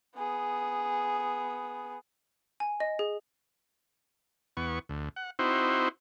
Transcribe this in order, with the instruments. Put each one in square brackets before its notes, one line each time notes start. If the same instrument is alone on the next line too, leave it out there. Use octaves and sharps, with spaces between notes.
[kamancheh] B3 G#4
[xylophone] G#5
D#5
G#4
[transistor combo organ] E2 B3 C#6
D2
F#5
C4 D#4 E4 F#4 C5